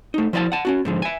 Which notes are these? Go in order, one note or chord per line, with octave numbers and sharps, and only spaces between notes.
A3 D#4
F3 E4 D5 G5 A5
F#5 A5
C#4 D4 F#4
G#2 D3 F3
E5 G#5